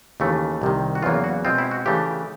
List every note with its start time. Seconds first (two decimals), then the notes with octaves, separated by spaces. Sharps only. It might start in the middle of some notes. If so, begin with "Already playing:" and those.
0.20 D#2 C#3 E3 A3
0.62 C2 C3 D#3
0.95 F#4
1.02 E2 C#3 F#3 A#3 F4
1.24 F#4
1.45 B2 G#3 C4 F4
1.58 E4
1.71 F#4
1.86 C#3 E3 A3 D4 G4